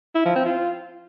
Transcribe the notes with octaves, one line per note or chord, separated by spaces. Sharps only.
E4
F3
C4
F4